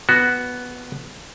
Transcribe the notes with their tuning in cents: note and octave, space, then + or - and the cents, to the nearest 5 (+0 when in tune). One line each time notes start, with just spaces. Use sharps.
B3 +0 F#4 +0